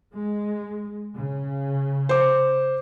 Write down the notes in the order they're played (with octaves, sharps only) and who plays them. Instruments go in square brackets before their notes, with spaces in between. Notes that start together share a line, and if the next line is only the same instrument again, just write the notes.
[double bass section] G#3
C#3
[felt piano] C5 D6